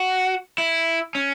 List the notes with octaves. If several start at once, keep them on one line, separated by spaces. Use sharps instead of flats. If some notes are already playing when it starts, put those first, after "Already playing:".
Already playing: F#4
E4
C#4